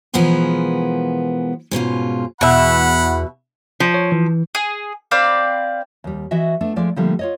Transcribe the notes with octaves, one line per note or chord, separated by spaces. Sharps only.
B2 E3 F3 G#3 B3 A#4
G#2 B2 C#4 F4
E2 B2 E5 F#5 B5
F3
C#5
E3
G#4
C4 D5 F5 B5
D#2 G3
E3 F#4 D#5 E5
A3 B3 D4
F3 G#3 A3 D5
D3 F3 G3 A3 A#3 D4
F4 C#5 D#5